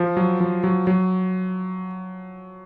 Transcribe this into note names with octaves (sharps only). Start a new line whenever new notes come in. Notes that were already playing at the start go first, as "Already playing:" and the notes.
Already playing: F3
F#3
F3
F#3
F#3